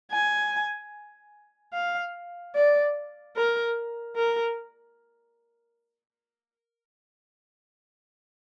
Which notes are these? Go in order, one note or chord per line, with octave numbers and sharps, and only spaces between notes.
G#5
F5
D5
A#4
A#4